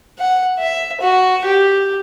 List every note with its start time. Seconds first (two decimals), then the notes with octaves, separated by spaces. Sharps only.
0.19 F#5
0.59 E5
1.01 F#4
1.45 G4